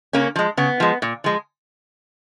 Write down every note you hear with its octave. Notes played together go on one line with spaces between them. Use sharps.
C#3 A#3 C#4
F3 G#3
C#3 B3
F3 G#3
A#2
F3 G#3